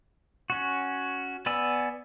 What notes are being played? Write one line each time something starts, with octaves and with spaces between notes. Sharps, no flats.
C#4 F#4
B3 D5 G#5 E6